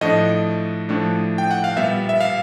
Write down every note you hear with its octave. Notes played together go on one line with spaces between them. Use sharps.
A2 F3 A3 D4 D#5
A2 F3 A3 D4
G5
F#5
F5
A#2 G3 B3 E5
E5
F5